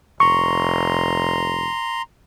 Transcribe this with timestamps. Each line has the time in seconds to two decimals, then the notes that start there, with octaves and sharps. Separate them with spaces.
0.20 F1 A#5 C6 C#6